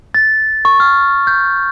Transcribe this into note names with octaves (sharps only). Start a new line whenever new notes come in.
A6
C#6
F6
G6